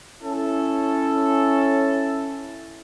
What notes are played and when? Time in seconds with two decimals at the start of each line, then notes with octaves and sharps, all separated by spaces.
0.21 C#4 E4 A4